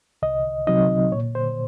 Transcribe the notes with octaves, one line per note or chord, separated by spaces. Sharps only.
C2 D#5
C3 F#3 C4 D#4 D#5
A#2 C#5
C5